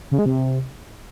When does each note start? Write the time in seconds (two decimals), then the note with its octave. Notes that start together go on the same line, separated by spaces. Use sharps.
0.11 C#3
0.19 G#3
0.26 C3